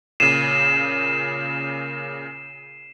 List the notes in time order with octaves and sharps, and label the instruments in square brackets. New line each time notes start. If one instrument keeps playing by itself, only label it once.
[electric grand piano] A#2 C#3 [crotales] C7 D#7 E7